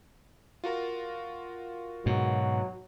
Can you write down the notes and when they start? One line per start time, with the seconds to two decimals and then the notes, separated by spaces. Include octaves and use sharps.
0.64 F4 F#4 A#4
2.06 G#2 B2 F#3